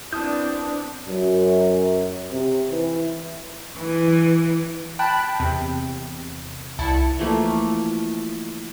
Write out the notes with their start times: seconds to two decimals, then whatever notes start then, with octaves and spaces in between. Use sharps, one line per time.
0.13 B3 C4 D4 E4 A5 D#6 G6
1.08 F#2
2.31 C3
2.71 E3
3.79 E3
4.99 G5 A5 B5 F#6
5.40 E2 C3
6.79 C2 E4 A5 C#7
7.19 E3 F3 A3 A#3